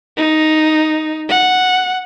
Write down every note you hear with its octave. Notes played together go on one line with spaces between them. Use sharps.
D#4
F#5